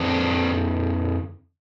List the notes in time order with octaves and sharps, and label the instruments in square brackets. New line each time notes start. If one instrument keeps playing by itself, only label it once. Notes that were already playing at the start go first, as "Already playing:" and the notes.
Already playing: [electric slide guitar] F2 D3 C4 D4